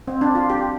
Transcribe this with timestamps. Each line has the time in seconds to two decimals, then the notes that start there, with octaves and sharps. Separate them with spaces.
0.08 C4
0.21 D4
0.35 F4
0.50 G4